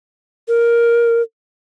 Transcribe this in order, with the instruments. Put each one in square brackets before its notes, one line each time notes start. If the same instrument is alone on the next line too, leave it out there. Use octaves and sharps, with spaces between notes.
[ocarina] A#4